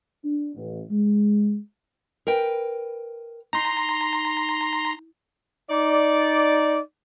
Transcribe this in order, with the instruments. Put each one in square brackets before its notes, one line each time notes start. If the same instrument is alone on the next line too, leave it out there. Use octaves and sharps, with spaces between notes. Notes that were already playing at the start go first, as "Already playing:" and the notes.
[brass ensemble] D4
A1
G#3
[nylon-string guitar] A#4 B4 G5
[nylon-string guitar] D#4 [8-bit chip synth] A#5 C6
[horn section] D#4 D5